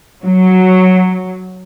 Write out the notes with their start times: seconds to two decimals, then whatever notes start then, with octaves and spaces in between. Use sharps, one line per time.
0.24 F#3